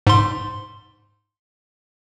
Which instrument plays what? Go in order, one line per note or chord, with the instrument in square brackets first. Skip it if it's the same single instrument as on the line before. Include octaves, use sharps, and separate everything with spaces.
[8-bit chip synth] G#2 C6